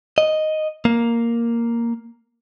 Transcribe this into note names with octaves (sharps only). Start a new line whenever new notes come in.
D#5
A#3